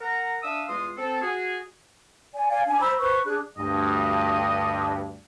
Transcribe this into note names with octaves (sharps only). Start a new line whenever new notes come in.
A#4 F#5 A#5
D4 E5 F5 D#6 E6
E2 G#3 F4 C6 D#6
C4 A4
F#4 G#4
D5 G#5
D5 F5 G#5
D4 G#5
C5 A#5 B5 E6
B4 C5 C#6
D4 G#4 F#6
D2 G2 D#5